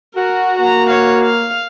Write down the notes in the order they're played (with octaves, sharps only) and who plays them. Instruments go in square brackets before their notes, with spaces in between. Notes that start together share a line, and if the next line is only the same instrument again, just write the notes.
[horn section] F#4 [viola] A#4
[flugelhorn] A#3 [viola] A#5
[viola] C#5 F5
F5